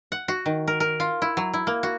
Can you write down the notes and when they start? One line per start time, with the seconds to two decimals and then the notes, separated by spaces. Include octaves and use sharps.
0.12 F#5
0.28 F#4
0.46 D#3
0.67 A#4
0.80 A#4
1.00 F4
1.22 E4
1.37 F#3
1.54 E4
1.67 A#3
1.83 F#4